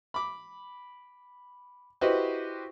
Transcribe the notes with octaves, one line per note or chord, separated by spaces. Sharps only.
B5 D6
E4 F#4 G4 B4 C5 D#5